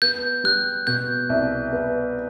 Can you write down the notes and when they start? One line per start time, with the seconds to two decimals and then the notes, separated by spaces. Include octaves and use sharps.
0.02 B3 G6
0.44 G3 F#6
0.87 B2 G6
1.29 C2
1.73 B3